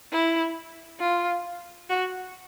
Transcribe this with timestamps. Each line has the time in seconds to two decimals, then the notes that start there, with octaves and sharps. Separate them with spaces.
0.12 E4
1.00 F4
1.90 F#4